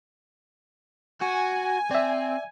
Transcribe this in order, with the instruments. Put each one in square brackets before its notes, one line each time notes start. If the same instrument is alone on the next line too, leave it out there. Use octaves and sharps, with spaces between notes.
[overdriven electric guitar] F#4 [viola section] G#5
[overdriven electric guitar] C4 [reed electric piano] D5 E5